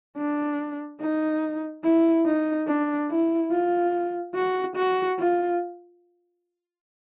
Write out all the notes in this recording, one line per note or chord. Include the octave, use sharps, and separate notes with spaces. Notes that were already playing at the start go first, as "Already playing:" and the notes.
D4
D#4
E4
D#4
D4
E4
F4
F#4
F#4
F4